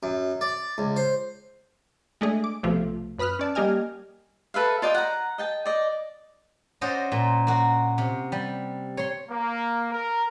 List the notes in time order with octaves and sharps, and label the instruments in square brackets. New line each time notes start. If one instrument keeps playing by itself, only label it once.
[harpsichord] F#2
D5
C#2
C5
[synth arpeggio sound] G#3 A3 D4 G#4
D6
B1 C3 F3 A3 F4
F#2 B4 B5 D#6 F6 F#6
C#4 D5 A5
G3 A#3 G4 D#5 G#5 F6
[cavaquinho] A4 B4 E5 F5
F4 D5 D#5 G5
F#5 A#5
D#5 G5 A5
D5 D#5
[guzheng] C#4 F#4 C5 D5 D#5
A#2
A#3 F#4
C3
G3
C#5 C6
[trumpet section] A#3
A#4